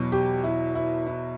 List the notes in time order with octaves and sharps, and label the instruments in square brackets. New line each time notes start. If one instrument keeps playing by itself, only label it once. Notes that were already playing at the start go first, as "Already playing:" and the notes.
Already playing: [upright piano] E2 B2 F#3
G4
E4
E4
E4